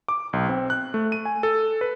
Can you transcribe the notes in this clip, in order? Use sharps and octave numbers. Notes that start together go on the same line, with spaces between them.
D6
B1
C4
F#6
A3
D#7
G#5
A4
B4